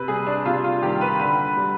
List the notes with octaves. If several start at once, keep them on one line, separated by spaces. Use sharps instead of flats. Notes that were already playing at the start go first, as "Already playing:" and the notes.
Already playing: C3 B4
G3 G#4
D4
C3 F4
F4
D#3 G3 G4
B4
D3 B4
G3